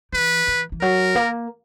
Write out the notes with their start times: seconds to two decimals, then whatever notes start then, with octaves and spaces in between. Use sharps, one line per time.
0.13 E3 B4
0.47 E3
0.72 E3
0.81 F#3 A#4
1.15 A#3